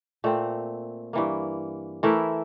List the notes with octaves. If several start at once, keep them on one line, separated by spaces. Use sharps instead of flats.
A#2 A3 C4
G2 E3 A#3
E3 A3 E4 A#4